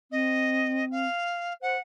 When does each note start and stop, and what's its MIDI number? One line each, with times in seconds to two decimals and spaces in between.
0.12 1.07 60
0.12 0.85 75
0.91 1.53 77
1.62 1.76 72
1.62 1.79 78